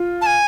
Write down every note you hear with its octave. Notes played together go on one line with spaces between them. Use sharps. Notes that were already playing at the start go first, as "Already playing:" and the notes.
Already playing: F4
A5
G#5